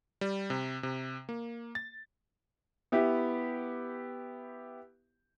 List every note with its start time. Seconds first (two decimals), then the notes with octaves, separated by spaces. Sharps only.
0.21 G3
0.50 C3
0.83 C3
1.29 A#3
1.75 A6
2.92 B3 E4 G4